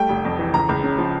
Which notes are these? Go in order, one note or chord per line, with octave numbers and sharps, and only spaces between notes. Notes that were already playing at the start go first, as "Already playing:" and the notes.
Already playing: G3 A3 G5
F1
F2
E3
C#2 A#5
C#2
C#3
F3